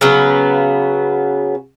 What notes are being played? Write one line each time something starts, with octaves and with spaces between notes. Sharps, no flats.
C#3 F#3 B3